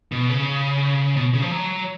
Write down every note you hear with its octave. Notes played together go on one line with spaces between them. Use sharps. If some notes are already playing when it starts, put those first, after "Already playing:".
B2
C#3
B2
C#3
F3
F#3